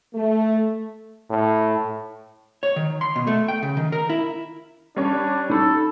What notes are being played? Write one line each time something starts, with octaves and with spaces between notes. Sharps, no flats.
A3
A2
C#5
D#3
C6
B2
A3
G5
C#3
D#3
A#4
E4
G3 C#4 D4 C#5
D#4 A4 B5